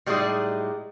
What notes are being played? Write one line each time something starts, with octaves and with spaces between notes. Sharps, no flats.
A2 G3 G#3 D#4 G#4 D5